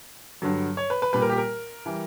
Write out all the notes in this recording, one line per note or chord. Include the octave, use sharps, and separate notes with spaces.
G2 D3 F#3
C#5
B4
B4
A#2 G3 B4
A#4
G4
A#4
E3 G3